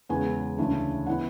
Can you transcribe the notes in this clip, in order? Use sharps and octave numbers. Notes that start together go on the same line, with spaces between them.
E2 C#3 G#3 B3 G#5
D2 C#3 E3 A3 D4
E3 B3 E4 F#5